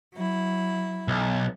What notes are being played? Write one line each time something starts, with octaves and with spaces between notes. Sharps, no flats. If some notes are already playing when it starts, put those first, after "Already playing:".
F#3 E4
B1